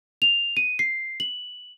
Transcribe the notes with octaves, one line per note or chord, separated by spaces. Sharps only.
F7
D#7
C7
F#7